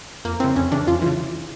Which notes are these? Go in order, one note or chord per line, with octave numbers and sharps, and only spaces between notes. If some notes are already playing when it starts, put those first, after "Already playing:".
F2 A#3
C#3 E3 C4
F2 C#4
C#3 E3 D4
F2 F4
C#3 E3